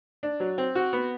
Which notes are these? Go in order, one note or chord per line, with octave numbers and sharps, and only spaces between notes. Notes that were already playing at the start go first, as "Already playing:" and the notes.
D4
F#3
C4
F#4
B3